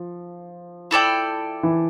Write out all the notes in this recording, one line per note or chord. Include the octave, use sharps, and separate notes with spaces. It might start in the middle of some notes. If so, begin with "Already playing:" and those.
Already playing: F3
E4 A4 D5 G5
E3